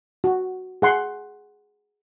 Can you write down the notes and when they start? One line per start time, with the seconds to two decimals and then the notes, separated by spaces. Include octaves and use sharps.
0.24 F#4
0.82 G#4 F#5 C6